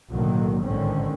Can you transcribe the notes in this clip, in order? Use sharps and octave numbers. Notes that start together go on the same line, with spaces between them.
B1 A2 D3 D#3 F#3 A#3
A1 G#2 D3 D#3 C4 C#4